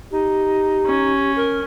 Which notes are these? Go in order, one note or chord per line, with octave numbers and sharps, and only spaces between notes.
D#4 G4
C#4
A#4